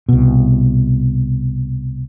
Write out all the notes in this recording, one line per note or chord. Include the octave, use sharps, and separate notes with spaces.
C2 B2